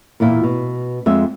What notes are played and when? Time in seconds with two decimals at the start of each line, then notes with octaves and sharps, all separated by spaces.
0.20 E2 A#2 E4 F4
0.43 B2
1.06 F2 G#3 E5